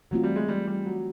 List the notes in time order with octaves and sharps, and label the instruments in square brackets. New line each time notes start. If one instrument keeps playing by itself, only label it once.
[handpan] E3 A3 C4 F4 [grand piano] F#3
[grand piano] G3
G#3
G3
G3
F#3